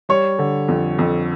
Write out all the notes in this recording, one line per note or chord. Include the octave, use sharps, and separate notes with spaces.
G3 C#5
D3
F2
F2